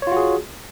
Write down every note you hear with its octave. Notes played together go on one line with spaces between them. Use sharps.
F4 F#4 G#4 C#5